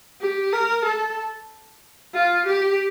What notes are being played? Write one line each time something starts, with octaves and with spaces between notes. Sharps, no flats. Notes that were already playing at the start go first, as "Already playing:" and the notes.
G4
A#4
A4
F4
G4